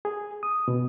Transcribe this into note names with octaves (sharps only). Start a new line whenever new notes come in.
G#4
D#6
B2